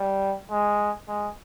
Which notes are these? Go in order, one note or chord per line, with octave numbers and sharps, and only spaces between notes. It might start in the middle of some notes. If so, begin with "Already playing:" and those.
Already playing: G3
G#3
G#3